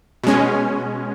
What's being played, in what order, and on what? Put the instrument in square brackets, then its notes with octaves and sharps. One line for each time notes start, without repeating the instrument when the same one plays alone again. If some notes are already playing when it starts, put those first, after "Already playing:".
[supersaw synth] B2 G#3 C#4